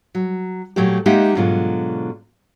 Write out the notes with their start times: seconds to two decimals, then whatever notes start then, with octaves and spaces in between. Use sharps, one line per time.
0.15 F#3
0.76 A#2 F#3 A3 A#3 G4
1.06 G#3 A#3 D#4 G4 E5 F#5
1.35 G#2 B2 D3 F#3 F4